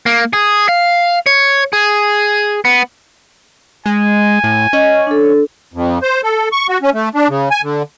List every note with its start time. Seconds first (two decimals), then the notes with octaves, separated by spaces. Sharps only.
0.06 A#3
0.33 G#4
0.69 F5
1.26 C#5
1.73 G#4
2.65 B3
3.86 G#3 G#5
4.44 A2
4.73 C#4 D#5
5.07 D4 A4
5.74 F2
6.02 C5
6.23 A4
6.52 C#6
6.69 F#4
6.82 C#4
6.94 A3
7.15 D4
7.29 C#3
7.51 G#5
7.62 D3